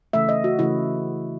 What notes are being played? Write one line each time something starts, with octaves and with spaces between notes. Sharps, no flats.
C#3 E3 A3 E5
D#5
F#4
C#3 E3 A3 E4